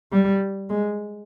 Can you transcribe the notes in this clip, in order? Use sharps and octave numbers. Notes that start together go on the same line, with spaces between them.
G3
G#3